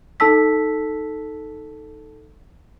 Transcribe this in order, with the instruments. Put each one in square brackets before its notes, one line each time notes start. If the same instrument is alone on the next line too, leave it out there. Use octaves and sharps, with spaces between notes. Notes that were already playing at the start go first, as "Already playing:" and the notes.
[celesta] D#4 A4 A5 E6 B6